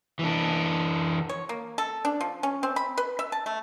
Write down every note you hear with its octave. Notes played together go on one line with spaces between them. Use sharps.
E3 D4
C#5
A#3
A4
D4
F3
C#4
C4
B5
B4
E5
A5
A3